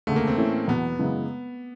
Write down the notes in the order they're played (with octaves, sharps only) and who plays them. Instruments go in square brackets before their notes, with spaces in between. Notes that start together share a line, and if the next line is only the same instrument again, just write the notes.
[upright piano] E1 D2 C#3 [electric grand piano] A3
[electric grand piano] A#3
C4
[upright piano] A2 E3 A3 C#4
[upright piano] E2 B2 F#3 [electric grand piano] B3
[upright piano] F#2 C#3 E3 G#3